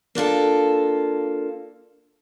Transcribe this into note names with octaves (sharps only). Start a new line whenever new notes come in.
A#3 D4 F4 A4